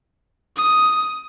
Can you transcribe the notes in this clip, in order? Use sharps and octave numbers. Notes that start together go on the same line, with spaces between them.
D#6